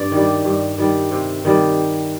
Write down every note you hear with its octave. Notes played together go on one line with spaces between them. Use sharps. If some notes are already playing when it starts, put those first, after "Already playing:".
Already playing: G2 D5
D#3 G3
G2
D#3 G3
C3
D#3 G3